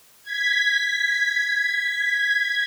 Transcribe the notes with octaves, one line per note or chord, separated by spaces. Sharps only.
G#6 B6